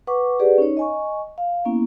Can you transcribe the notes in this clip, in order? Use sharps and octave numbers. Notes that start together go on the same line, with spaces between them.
B4 F#5 C#6 D6
G4 G#4 B4 D5 F#5
C#4 D#4 C#5
D#5 G#5 C#6
F5
A#3 B3 C#4 E4